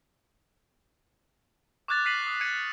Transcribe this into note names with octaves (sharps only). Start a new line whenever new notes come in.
C#6 D6 F6 F#6 G#6 A6
F6 F#6 B6 C7 D#7 F#7
D#6 C7
G#6 C#7 D#7